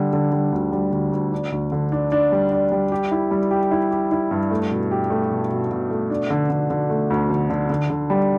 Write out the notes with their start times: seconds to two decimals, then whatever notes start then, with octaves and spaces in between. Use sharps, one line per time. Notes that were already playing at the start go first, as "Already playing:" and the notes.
Already playing: D3 G3
0.13 D3
0.32 G3
0.52 D2
0.72 G3
0.92 D2
1.12 D2
1.32 D4
1.52 D2
1.72 D3
1.92 D4
2.12 D4
2.32 G3
2.52 D4
2.72 G3
2.92 G4
3.11 E4
3.31 G3
3.51 G4
3.71 E4
3.91 G4
4.11 E4
4.31 G2
4.51 A3
4.70 B2
4.91 G4
5.10 A3
5.31 B2
5.51 B2
5.71 B2
5.91 A3
6.10 D4
6.30 D3
6.50 D3
6.70 D3
6.90 A3
7.10 D2
7.30 D3
7.50 D3
7.70 D3
7.90 D3
8.10 G3